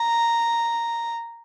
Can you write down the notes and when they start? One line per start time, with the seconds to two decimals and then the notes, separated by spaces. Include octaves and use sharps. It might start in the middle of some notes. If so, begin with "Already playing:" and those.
Already playing: A#5